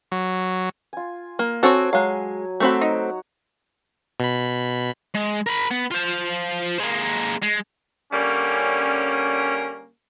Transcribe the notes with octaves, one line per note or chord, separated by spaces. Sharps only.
F#3
F4 G#5
A#3
C4 F#4 A4 C#5 G#5
F#3 G#3 F5
A3 C4 F#4 A#5 B5
D#4
B2 B5
G#3
A#4 B5
B3
F4 C5
G#3 A#3
G#3
D3 G3 A#3 C#4